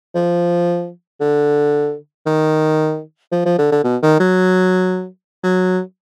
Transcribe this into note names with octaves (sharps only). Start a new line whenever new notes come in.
F3
D3
D#3
F3
F3
D3
D3
B2
D#3
F#3
F#3